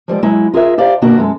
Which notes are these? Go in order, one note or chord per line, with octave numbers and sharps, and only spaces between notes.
F3 G3 G#3 D5
F#3 G#3 E4
F4 G#4 A#4 E5
D#4 G4 C5 D5 F5
B2 D#3 A#3 D4 F#4
F#2 G#3 A4